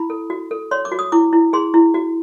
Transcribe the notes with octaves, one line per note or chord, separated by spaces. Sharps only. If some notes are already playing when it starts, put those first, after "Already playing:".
Already playing: E4 B5
A4
F#4
A4
C#5 C6
D6
F#4
D#6
E4 D6
E4
G#4 C6
E4
F#4